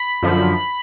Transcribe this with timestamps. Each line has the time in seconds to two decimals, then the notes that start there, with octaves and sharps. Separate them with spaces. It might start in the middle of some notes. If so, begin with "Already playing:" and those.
Already playing: B5
0.23 F#2 D3 F3